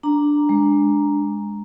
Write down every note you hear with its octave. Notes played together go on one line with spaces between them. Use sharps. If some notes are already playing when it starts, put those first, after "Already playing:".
D4 A#5
G#3